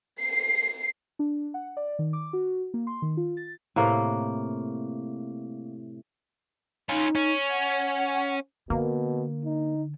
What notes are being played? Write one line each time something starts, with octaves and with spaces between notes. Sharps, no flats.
C7
D4
F#5
D5
D#3
D6
F#4
A#3
C6
D#3
F4
A6
A2 C3 A#3
C#4 D#4 F4
C#4
F#5
B2 D3 A#3
D#4